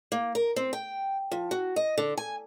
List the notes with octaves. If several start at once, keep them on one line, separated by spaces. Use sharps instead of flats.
A#3
A#4
C4
G5
F3
F#4
D#5
D3
G#5